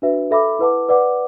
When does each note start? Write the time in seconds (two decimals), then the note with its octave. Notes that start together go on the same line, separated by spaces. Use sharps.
0.02 D4 F#4 B4 E5
0.31 A4 E5 B5 D6
0.59 E4 B4 F#5 A5 D6
0.89 B4 D5 F#5 D6